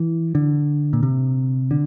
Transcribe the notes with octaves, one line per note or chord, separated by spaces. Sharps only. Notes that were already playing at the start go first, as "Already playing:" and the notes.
Already playing: E3
D3
A#2
C3
D3